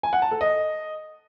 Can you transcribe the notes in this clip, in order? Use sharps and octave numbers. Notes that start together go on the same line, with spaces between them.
G#5
F#5
A5
A4
D#5